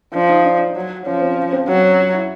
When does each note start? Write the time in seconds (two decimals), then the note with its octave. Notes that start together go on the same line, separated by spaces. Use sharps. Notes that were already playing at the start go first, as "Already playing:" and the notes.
0.14 F3 D4
0.29 D#4
0.45 D4
0.75 F#3
1.06 F3 C#4
1.22 C4
1.36 C#4
1.53 C4
1.68 F#3 C4
1.83 C#4
1.98 F4
2.13 E4